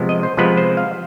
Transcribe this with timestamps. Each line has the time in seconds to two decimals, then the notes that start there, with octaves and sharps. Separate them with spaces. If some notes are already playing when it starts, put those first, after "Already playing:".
Already playing: C3 F3 G#3 B3
0.09 D#5
0.23 C5
0.37 C3 F3 G#3 B3 B4
0.57 C5
0.77 F5